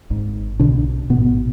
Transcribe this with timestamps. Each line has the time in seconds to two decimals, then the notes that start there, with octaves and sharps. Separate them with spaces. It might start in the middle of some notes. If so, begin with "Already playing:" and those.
0.10 G#1 G#2
0.59 B1 B2 D3 D4
1.10 A1 G#2 B2 B3